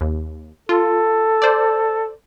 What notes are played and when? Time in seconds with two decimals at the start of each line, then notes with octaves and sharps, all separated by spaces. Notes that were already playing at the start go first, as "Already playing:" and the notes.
0.01 D#2
0.69 F4 A4
1.42 C5 D5